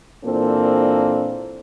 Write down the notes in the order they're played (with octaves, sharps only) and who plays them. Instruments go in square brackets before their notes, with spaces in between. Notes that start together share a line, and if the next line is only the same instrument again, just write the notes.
[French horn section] A#2 E3 A#3 C4 D4 A4